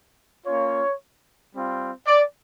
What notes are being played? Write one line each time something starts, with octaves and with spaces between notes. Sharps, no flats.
A#3 C#4 F4 C#5
G3 C4 F4
D5